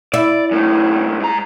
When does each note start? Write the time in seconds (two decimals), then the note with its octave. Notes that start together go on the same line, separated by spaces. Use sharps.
0.14 E4 D5
0.51 F#2 A2
1.20 G#2 A#5